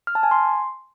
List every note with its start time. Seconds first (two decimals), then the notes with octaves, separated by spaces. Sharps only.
0.07 F6
0.15 A5
0.23 G#5
0.31 C6